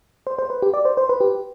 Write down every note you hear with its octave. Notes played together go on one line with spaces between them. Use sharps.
C5
C5
B4
G4
D5
C5
C5
B4
G4